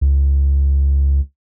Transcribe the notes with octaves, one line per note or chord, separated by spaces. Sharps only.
C#2